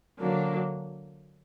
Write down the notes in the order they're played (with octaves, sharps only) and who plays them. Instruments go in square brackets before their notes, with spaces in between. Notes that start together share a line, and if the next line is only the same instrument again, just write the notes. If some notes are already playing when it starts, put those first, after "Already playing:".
[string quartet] D3 F#3 A#3 D4